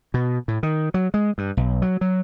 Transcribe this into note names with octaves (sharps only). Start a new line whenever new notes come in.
B2
A2
D#3
F#3
G#3
G2
B1
F#3
F#3